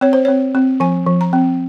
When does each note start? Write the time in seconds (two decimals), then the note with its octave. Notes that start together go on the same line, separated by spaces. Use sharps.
0.01 C4 C#5
0.13 C5
0.25 C4 C#5
0.55 C4
0.80 F3 G#5
1.06 F3
1.21 A#5
1.33 C4